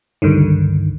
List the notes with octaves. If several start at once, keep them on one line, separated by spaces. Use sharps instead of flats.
C#2 G2 D3 D#3